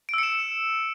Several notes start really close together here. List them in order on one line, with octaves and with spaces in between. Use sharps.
D7 E6 C#7 E7